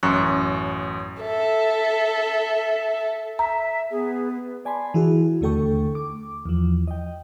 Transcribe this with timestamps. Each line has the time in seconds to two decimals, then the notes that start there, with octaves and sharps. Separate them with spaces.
0.03 A1 F#2 C#6 F#6
1.21 A4 E5
3.39 E5 A#5
3.91 B3 G#4
4.65 D5 G#5 A5 B5 C6
4.94 E3 E4 F#4 G#4
5.41 D#2 D3 A3 A4 G5 C#6
5.95 D6
6.46 E2 F3
6.88 D#5 G5